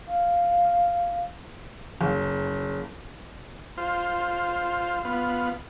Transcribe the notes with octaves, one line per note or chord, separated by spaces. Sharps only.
F5
F#1
F4 C5
B3 F4